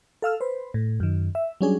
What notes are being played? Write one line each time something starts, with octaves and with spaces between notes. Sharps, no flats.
A4 F5 E6 F6
B4 C5
A2
F#2 D#3
E5
F#3 G3 C#4 D4 G#4